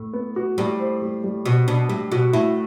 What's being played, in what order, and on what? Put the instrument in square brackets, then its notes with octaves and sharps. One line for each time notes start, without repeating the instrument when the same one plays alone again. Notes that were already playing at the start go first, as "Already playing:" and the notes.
Already playing: [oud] A2
[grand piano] B3
F#4
[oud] A2 [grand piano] G3
[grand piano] C5
G3
G3
[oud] B2 [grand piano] F#4
[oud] B2 [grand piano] D4
[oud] A2 [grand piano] G3
[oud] B2 [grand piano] F#4
[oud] A2 [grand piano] E4